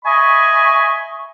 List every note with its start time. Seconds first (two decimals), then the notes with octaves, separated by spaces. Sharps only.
0.05 D#5 E5 G#5 B5 C#6